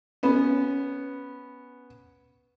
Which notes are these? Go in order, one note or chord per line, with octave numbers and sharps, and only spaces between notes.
B3 C#4